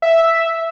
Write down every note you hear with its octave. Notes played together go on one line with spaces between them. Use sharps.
E5